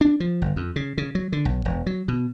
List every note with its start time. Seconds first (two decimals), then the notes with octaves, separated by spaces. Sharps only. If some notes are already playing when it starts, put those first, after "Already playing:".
0.01 D4
0.20 F3
0.42 G1
0.56 F2
0.76 C#3
0.98 C#3
1.15 F#3
1.32 D3
1.45 B1
1.65 E1
1.86 F#3
2.08 B2